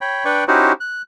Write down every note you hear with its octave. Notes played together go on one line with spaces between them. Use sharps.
C#5 G5 B5
D4 B4 D5 G5 C#6
C#4 D#4 E4 F#4 G4 C5
F#6